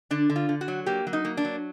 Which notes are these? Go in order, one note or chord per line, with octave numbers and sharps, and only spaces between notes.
D3 D4
D3
F4
D3
F#4
F#3
A#3 G4
F#3
D#4
A#3
D4
F#3